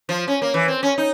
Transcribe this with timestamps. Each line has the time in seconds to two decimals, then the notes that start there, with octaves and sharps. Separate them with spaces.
0.09 F3
0.28 C#4
0.42 A#3
0.54 E3
0.68 C4
0.83 C#4
0.98 D#4